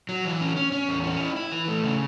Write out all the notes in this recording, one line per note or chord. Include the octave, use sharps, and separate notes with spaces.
F#3
E3
C#4
C#4
C#4
E2
C#4
E4
E4
E3
A3
C#3